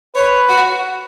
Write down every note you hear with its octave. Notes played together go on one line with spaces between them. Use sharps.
B4 C#5
F#4